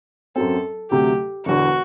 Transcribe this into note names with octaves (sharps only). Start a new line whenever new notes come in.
F#2 F#3 C4 A4
D2 C3 F#3 A3 G4
E1 E2 D3 F#4